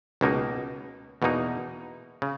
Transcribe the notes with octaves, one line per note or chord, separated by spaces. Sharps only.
C#2 B2 A#3 D#4
E2 B2 A#3 D#4
C#3